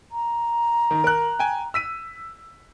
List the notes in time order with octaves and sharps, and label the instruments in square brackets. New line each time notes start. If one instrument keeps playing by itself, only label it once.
[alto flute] A#5
[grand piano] D#3
A#4 F#6
G5 G#5
E6 B6 D#7